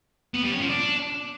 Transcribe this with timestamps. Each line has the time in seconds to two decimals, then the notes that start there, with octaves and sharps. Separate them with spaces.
0.34 B3
0.43 G3
0.52 C#4
0.60 F3
0.69 D4